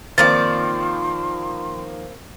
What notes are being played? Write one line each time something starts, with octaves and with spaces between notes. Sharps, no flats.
D#3 F3 A#3 C4 D5 C6 A6